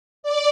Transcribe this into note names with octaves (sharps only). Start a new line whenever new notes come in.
D5